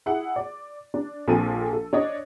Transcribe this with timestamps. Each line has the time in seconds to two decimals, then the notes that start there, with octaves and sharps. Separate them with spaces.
0.06 E4 G#4 F#5
0.36 D5
0.94 D4
1.28 A#1 F3 C4 A4 G#5 D#7
1.73 A4
1.93 D4 C#5 D#5